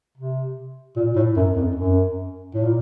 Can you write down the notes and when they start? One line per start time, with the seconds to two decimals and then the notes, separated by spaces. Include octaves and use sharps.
0.17 C3
0.96 A#2
1.16 A2
1.36 F#2
1.56 F2
1.76 F#2
2.55 A2
2.64 A#2